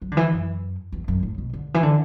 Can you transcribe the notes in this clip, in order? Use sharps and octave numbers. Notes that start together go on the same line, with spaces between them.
F#3
D3
E3
F#2
E2
F#2
A2
B2
D3
E3
D3